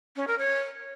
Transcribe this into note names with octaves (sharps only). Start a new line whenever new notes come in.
C#4
A#4
C#5